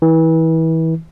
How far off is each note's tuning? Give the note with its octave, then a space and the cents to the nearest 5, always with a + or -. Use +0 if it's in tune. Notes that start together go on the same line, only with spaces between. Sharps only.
E3 -30